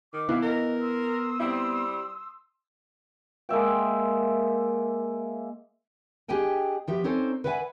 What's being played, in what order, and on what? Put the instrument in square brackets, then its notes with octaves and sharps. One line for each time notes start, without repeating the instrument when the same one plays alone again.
[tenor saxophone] D#3 [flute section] D6
[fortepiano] E3 E4 F5 [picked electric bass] B3
[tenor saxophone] A#4 [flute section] D#5
[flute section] C6 D#6 E6
[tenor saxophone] G3 [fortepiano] C4 E4
[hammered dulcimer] G#3 A#3 E5 G5
[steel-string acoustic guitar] D4 G4 G#4 D#5 G5 G#5
F3 B3 G4 E5
C4 C#4 D#4 A4 C5 D5
B4 D5 E5 F#5 G#5